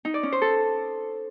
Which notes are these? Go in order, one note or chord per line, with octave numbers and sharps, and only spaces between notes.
D#4
D5
C#4
C5
A4